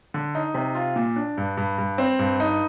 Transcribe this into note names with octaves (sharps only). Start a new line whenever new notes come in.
D3
D#4
C3
F4
A#2
D4
G2
G2
G2
C4
G2
D#4